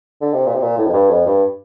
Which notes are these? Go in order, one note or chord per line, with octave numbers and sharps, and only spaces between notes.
D3
C3
A#2
C3
A#2
A2
F2
G2
F2
G2